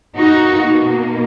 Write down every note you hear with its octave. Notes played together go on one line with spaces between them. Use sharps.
B2 A#3 D#4 F#4